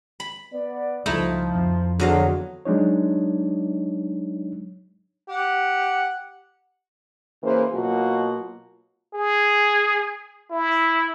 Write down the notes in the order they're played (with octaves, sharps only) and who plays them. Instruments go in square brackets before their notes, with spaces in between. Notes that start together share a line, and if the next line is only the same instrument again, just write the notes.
[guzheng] B5
[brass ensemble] B3 D5
[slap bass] C#2 G3 [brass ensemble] F3 [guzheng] A3 D#4 E4
[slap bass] F2
[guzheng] E2 D#5 F5 [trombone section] D3 F#3 [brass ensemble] F3
[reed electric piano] F#3 G#3 D4 D#4 C#5
[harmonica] G4 F#5
[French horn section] C#3 E3 A#3 B4 C5
B2 F#3 A#3 F4 F#4
[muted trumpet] G#4
E4